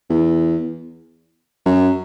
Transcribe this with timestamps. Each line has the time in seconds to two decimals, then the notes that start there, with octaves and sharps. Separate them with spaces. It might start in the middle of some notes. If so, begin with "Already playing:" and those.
0.10 E2
1.66 F#2